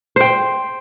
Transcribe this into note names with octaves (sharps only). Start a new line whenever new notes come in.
C5 G5